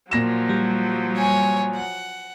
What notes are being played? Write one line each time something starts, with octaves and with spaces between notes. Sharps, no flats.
A#2 F3 F#3 A#6 E7
G3
C#5 G#5
F#5